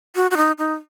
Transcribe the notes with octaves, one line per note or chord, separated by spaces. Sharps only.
F#4
F#4
D#4
D#4